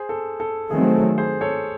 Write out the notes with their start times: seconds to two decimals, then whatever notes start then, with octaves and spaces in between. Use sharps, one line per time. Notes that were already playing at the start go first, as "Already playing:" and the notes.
Already playing: G#4 C5
0.09 A4
0.40 A4
0.71 D#3 F#3 A3 C4 G#4
0.95 A4
1.18 G#4 C5
1.41 A4 C#5